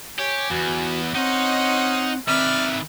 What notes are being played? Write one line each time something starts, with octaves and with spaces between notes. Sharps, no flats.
G4 C#5 G#5
E2 B3 F#4
C4 C#4 D#4 C5 D#5 F#5
D#3 C4 B4 D5 E5 B5 F6